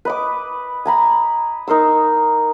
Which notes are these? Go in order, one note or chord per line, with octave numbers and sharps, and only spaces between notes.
B4 D#5 D6
G#5 A#5 B5
D#4 A#4 C6 E6